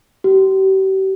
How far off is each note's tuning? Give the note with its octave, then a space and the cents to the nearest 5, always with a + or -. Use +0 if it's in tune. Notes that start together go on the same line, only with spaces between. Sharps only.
G4 -40